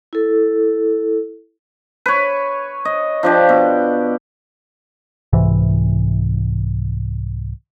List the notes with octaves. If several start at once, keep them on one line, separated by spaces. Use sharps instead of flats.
E4 A4
B4 C#5
D#5
F3 D4 G4
B2
C2 G#2 C3 E3